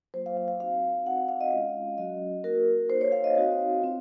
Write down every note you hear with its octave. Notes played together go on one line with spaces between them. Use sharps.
F#3 A#3 F4 C5
F5
F5
F5
C4 D#4 F#4 F5
C4 D#4 F#4 F#5
F5
F5
D#5
G#3 C#4 F4 F5
F#3 C#4 F#4 D#5
A#3 D#4 F#4 A#4
A#3 D#4 F#4 C5
C#5
F5
D#5
C4 D#4 F#4 F5
C4 F4